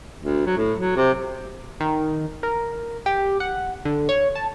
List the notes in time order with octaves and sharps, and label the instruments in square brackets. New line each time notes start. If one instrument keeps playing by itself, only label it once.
[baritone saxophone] D2
F#3
A2
F#3
C3
[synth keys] D#3
A#4
G4
F#5
D3
C#5
A5